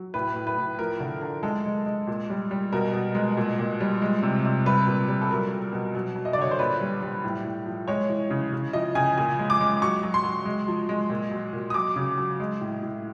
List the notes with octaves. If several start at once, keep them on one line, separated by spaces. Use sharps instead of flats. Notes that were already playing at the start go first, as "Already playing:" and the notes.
Already playing: F#3
A2 B4
A2
B4
A2
F3 A#4
D3
D3
G#3 A4
G#3
G#3
A#2
G3
G3
B2 A#4
B2
G#3
A#2
A#2
G3
G#3
C3
C3
G3 B4
A#2
G3
A4
F#3 A#4
F#3
B2
F#3
F#3
D#5
D5
D3 C#5
C5
A#2 B4
G3
G3
A2
A2
F3
G#3 C#5
E3
C#3
C#3
F3 D#5
C#3 G#5
A#2 G#5
G#3
D6
G#3
F#3 C#6
F#3
C6
F#3
G#3
F3
G#3
A#2
F#3
A#2
D#6
F#3 D6
C#3
F#3
G#3
A2
A2